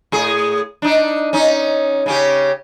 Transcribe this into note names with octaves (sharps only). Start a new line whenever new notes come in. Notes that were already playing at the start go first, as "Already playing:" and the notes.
A2 G#4
D4 D#4
C#4 D#4
C#3 C#4 G4